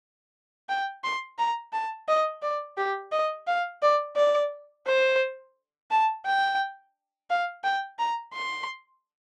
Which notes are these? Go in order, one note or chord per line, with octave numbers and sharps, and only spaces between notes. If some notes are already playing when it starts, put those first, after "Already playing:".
G5
C6
A#5
A5
D#5
D5
G4
D#5
F5
D5
D5
C5
A5
G5
F5
G5
A#5
C6